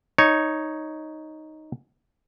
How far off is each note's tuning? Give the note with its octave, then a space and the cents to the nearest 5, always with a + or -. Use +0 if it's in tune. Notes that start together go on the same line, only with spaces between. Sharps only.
D#4 +0 C#5 +0